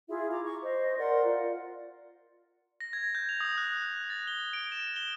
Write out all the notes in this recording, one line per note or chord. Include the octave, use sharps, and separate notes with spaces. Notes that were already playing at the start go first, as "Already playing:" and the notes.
E4 F4 G#4 E5
A#5 D6
C#6
C5 D#5
A#4 D5 F#5 C6
F4 D5
A#6
G#6
G6
F7
D#6
F#6
F#6
A6
G7
D7
E7
G7